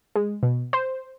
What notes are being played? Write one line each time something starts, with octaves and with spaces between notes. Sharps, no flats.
G#3
B2
C5